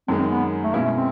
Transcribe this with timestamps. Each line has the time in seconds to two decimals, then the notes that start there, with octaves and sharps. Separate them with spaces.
0.08 F#2 D#3 G#3 C4
0.19 C4
0.30 B3
0.63 A3
0.74 B2 G#3 A#3 C#4 E4
0.85 A3
0.96 C4